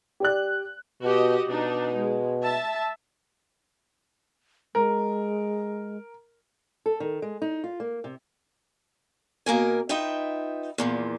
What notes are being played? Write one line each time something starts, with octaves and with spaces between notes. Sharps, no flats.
G4 D5 F#6
B2 F#4 G4 D#5
B2 D4 D#4
G#3
E5 A5
G#3 A#4
A4
D#3
G#3
D#4
F4
A#3
C3
B2 A#3 A#4 G#5
D#4 F4 B4 E5 G5
E2 A#2 F3